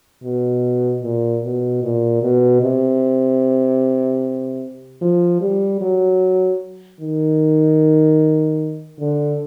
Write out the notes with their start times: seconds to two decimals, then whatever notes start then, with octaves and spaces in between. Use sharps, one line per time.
0.23 B2
1.03 A#2
1.43 B2
1.83 A#2
2.23 B2
2.62 C3
5.02 F3
5.41 G3
5.81 F#3
7.00 D#3
9.00 D3